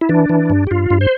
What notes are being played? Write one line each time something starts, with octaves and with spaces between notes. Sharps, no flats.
E4
E3 D4
E3
G2
G4
G2 F4
G2
C5